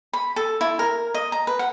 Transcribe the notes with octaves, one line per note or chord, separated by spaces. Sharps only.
B5
A4
E4
A#4
D#5
A#5
B4
F#5